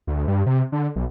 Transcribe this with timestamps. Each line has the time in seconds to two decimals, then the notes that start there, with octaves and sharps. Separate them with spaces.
0.07 D2
0.28 G2
0.46 C3
0.72 D3
0.96 B1